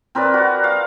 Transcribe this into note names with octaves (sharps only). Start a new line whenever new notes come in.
C4 A#4 B4 D5
F#4
F5